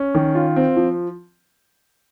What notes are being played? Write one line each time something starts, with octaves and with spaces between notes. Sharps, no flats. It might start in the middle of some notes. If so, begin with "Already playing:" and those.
Already playing: C#4
D#3
F4
C4
F3